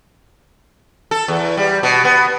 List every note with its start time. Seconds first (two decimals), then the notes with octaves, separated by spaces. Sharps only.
1.11 A4
1.28 E2
1.57 G3
1.83 B2
2.05 B3